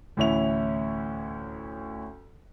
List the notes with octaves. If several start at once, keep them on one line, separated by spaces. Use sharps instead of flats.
D2 A2 E3 C#4 E4 F7